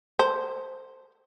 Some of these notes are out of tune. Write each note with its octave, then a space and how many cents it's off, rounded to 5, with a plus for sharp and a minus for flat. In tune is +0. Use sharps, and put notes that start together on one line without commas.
A4 +45 C5 +0